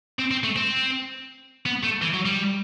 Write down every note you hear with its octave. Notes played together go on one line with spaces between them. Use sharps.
C4
C4
A3
C4
B3
A3
E3
F#3
G3